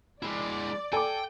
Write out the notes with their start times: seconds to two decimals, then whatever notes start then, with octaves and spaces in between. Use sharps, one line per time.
0.23 G#3 E4 D5
0.93 A4 G5 G#5 D6